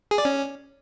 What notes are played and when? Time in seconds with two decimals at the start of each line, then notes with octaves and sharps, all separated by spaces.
0.11 G#4
0.18 D5
0.25 C#4